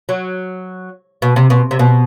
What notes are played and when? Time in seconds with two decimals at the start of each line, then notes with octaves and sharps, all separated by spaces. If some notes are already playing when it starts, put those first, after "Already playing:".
0.09 F#3
1.22 B2
1.36 C3
1.50 B2
1.71 C3
1.79 B2